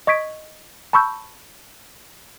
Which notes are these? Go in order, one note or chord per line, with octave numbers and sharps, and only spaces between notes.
D#5 C#6 G#6 B6 D7
A5 B5 C#6 E6 G6